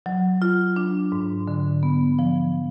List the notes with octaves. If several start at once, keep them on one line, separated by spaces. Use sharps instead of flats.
F#3
F4
D4
G#2
D3
B3
F3